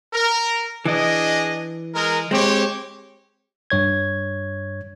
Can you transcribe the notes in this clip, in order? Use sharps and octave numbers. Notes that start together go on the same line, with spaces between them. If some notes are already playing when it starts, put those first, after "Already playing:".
A#4
E3 D4 G#4 D#5
G#3 A#4
G#3 C4 G4 C5 C#5
G2 C#5 G#6